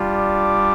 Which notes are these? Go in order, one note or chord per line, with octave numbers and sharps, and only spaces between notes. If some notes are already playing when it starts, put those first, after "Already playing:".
Already playing: G3 D4 F4
D6